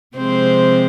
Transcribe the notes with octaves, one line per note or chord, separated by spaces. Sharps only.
C3 F3 G#3 C4 C5